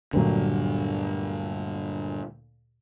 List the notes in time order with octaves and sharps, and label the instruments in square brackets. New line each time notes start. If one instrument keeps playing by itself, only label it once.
[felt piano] D2 A#2 F#3 [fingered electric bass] G2 D3